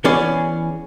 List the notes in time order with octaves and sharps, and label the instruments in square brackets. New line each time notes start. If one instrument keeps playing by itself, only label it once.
[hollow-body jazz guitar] E3 B3 C#4 G#4 D5